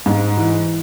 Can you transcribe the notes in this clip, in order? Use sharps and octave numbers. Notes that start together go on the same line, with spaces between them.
G#2
E3